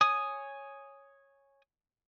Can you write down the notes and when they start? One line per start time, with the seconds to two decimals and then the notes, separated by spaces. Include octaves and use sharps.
0.01 C#5 G#5 D#6